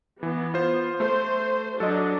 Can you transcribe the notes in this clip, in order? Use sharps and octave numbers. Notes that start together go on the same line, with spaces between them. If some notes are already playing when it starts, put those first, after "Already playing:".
E3 B3
F4 C5
A3 C5
F#3 D4 A4 D#5